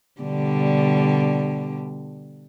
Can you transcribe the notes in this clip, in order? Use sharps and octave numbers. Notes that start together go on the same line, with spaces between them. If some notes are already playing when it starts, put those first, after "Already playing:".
B2 D3 G3